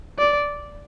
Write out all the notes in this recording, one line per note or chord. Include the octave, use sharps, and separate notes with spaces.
D5